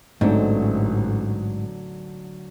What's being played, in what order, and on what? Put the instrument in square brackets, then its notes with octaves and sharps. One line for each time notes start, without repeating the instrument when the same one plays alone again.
[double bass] A1 [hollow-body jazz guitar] G#2 [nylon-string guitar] D3 F#3 C4 [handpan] A3 C#4 D#4